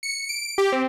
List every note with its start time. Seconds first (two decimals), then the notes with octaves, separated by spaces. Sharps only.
0.03 C#7
0.29 D7
0.58 G4
0.72 C4